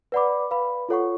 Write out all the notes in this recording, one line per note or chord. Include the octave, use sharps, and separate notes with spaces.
B4 D5 F#5 B5 D6
B4 F5 B5
F4 A4 C#5 F#5 C#6